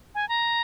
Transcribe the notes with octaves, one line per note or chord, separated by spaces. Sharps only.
G#5
A#5